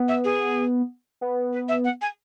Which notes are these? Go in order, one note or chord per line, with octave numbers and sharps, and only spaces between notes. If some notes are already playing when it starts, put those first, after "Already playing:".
Already playing: B3
E5
G#4
B3
B4
E5
F#5
G#5